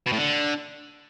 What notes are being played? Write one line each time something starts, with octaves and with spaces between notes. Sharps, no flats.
B2
A2
D3